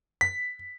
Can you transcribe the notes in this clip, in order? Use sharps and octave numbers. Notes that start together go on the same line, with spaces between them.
B6